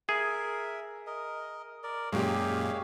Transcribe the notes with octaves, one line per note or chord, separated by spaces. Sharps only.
G#4 A#4 E5
A#4 D#5
A#4 D5
F#2 A#2 G#3 G4 C#5 F5